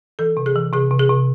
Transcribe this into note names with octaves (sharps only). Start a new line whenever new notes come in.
E3 A4
C3
G#4
E3
C3 G#4
C3
G#4
C3